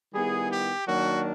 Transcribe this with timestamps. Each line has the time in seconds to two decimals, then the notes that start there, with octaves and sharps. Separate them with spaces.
0.13 D#3 G3 B3 E4 G#4
0.50 G4
0.86 D#3 F#3 A#3 D4 F#4